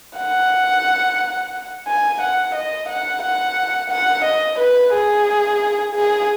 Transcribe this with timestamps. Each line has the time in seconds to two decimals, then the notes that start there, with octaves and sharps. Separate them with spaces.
0.17 F#5
1.88 G#5
2.21 F#5
2.55 D#5
2.89 F#5
3.23 F#5
3.90 F#5
4.25 D#5
4.59 B4
4.93 G#4
5.95 G#4